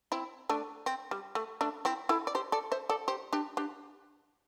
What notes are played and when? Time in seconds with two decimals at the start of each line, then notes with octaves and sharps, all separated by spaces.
0.12 C4 E4
0.49 A3 D4
0.86 C4
1.11 G3
1.35 A3
1.61 A3 D4
1.85 C4 E4
2.09 E4 A4
2.27 D5
2.35 G4 C5
2.52 A4 D5
2.72 C5 E5
2.89 A4 D5
3.08 G4 C5
3.33 D4 G4
3.57 D4 G4